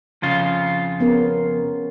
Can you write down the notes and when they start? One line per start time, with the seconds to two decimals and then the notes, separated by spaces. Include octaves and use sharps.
0.22 F2 C#3 F4
1.00 B3 C#4 A#4